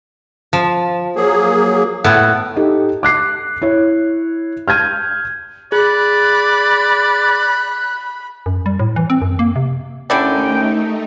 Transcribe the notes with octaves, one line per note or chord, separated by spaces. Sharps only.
F3
F#3 A#3 G#4
A2 B3 F#5
D#4 G4 A4
D6 F#6 C7
E4 C#5
F6 G6 G#6 D#7
G#4 D5 B5 F#6
F#2
G3
A2
E3
C4
F#2
A#3
C3
D#2 D3 A3 C#4 D#4 E4 D5 G5